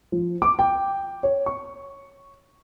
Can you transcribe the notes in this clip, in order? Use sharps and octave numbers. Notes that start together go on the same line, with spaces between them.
F3
D6
G5
C#5
C#6